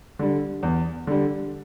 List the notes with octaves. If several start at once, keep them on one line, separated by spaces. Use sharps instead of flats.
D3 G3
E2
D3 G3